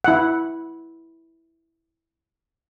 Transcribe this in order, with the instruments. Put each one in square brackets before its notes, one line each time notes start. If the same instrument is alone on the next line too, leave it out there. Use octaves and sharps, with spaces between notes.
[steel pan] E4 F#5